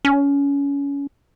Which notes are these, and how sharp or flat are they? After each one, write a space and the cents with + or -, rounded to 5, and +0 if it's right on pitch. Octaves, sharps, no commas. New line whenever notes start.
C#4 +25